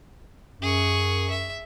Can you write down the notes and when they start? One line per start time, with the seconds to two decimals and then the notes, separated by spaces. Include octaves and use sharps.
0.62 F#2 G#4 C#6
1.30 E5